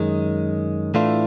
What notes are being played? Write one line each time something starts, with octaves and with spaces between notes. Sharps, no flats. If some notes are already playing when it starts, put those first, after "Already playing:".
Already playing: F#2 D#3 G#3
A2 E3 A3 D4 F4